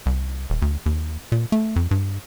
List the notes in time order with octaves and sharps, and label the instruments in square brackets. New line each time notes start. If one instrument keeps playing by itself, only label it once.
[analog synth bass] C2
D#1
D2
D#2
A#2
A3
F2
G2